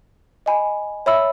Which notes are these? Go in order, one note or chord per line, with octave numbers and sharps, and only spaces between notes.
D#5 G#5 B5
C#5 E5 B5 E6